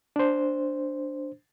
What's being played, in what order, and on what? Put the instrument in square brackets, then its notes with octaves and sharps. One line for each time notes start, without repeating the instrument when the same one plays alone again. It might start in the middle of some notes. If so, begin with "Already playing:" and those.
[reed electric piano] D4 C5